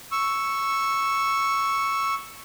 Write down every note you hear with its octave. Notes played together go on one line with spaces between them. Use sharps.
C#6 E6